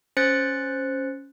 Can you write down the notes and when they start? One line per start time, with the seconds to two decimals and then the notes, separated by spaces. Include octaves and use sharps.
0.17 C#4 C5 F#6 G6 A6 C#7